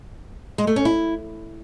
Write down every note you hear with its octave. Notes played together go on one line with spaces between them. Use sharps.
G#3
A3
C#4
E4